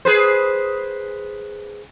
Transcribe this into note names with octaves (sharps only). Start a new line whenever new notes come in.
G#4 B4 C5